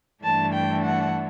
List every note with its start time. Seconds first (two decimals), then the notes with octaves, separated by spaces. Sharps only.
0.23 G2 E3 A3 D4 A5
0.54 G5
0.84 F#5